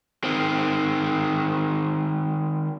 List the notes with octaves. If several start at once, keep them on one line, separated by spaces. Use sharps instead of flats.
D#3 C4